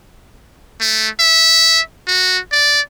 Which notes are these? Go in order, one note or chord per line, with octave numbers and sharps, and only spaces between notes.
A3
E5
F#4
D5